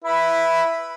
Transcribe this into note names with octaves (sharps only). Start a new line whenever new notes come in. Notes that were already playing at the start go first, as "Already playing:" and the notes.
E4 B4